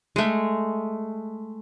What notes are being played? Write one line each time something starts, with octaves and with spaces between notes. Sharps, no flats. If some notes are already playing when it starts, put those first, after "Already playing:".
G#3 A3